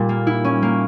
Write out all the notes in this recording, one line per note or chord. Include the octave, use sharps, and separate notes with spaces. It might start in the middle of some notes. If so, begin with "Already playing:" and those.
Already playing: A#2 G3
A#3
E4
C#4
A#3